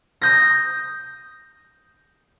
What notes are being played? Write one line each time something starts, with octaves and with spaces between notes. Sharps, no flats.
D#6 G6 A#6